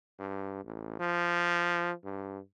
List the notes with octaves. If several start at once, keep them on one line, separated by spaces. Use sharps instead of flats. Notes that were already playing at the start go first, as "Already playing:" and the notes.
G2
A1
F3
G2